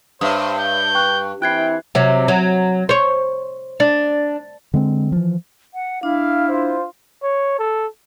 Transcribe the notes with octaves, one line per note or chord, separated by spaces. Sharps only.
G2 C5 C#5 E5 D#6
G6
G5 C#6 F#6
E3 C4 E4 G5 F#6 G#6 C7
C3 F#3
F#3
C5 C#5
D4
D3 G#3 C4
E3 F3
F#5
D4 E4 F5
F4 C5
C#5
A4